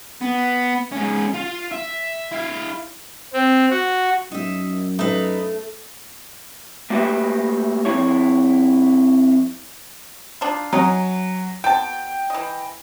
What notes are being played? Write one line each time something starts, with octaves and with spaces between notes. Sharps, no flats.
B3
G#2 C#4
F4 F5
E5
E4 F5
C4
F#4
F#2 D#4 E5
A3 D#4 B4
A3 A#3 F#4 G4 B4 E5
F2 E4 C#5
D4 D#4 F4
F#3 C#4 D#5 A#5
B2 G5 A5
E3 D#5